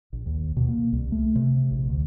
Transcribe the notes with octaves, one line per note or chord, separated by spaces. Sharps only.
A#1
D#2
B2
A#3
C2
A3
C3
A#1
D2